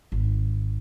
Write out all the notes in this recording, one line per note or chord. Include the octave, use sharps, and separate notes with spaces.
G#1